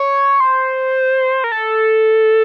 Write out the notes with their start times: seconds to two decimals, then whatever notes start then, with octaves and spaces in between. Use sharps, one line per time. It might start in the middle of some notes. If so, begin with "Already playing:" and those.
Already playing: C#5
0.40 C5
1.44 A#4
1.52 A4